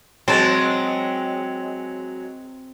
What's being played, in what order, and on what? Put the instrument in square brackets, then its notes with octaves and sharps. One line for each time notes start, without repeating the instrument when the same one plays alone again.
[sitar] F#3 G#3 [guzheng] C4 A5